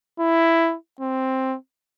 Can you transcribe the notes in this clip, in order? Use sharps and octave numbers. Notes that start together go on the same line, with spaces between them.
E4
C4